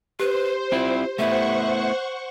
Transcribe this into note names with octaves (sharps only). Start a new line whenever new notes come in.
G4 B4 C5
C4 E4 F4
A3 B3 E4 C5 E5 F#5 C#6